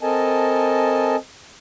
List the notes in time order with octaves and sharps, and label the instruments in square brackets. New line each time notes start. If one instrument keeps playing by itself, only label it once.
[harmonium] C4 A4 A#4 D#5 G#5 A5